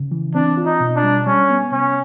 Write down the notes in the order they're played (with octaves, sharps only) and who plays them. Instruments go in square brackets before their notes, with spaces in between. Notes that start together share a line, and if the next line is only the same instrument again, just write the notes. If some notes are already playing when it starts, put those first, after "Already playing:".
Already playing: [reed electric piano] C#3
E3
[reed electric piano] C4 [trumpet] D4
[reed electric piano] F4
[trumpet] D#4
[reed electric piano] B2
[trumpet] D4
[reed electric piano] G3
[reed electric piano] G3 [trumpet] C#4
[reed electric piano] B3
[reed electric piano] C3 [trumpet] C#4